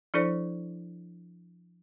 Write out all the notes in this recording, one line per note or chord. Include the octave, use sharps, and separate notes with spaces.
F3 D4 E4 A4 C5 D5